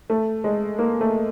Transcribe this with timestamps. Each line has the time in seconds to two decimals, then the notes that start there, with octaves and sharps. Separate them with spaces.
0.10 A3
0.44 G#3
0.79 A#3
1.01 A3